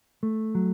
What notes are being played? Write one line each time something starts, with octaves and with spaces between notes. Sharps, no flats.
A3
F#3